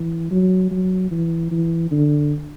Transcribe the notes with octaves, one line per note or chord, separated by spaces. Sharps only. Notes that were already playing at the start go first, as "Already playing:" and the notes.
Already playing: E3
F#3
F#3
E3
E3
D3